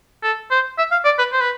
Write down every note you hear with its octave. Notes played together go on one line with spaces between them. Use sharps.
A4
C5
E5
F5
D5
B4
C5
B4